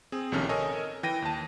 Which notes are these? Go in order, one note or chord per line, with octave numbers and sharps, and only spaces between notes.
C4 G#4
A#1 C3 D#3 C#4 A4 F6
A4 A#4 C#5 D#5 G#5
E3 G5 A#6 D#7
D#2 A5